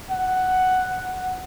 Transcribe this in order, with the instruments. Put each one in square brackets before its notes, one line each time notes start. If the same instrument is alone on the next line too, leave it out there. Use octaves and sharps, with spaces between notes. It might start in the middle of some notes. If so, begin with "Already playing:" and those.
[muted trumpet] F#5